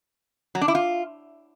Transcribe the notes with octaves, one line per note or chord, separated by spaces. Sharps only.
F#3
D4
E4
F4